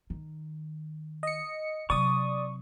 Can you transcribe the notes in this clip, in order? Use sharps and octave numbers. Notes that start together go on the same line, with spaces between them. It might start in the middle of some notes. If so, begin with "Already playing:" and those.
D#3
D#5 C#7
C3 F#3 D5 C#6 D#6